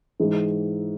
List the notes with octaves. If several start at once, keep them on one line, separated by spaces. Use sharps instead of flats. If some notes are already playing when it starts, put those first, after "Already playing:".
G#2 E3 G#3